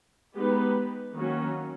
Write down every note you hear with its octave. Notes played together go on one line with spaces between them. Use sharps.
G#3 B3 D#4 G4 B4
D#3 F#3 A#3 C#4 F#4